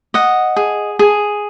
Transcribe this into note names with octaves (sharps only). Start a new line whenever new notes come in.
D#5 F#5
G#4
G#4